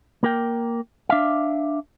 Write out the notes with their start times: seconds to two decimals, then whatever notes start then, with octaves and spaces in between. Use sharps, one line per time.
0.23 A#3 A#4 G5
1.09 D4 E5 F5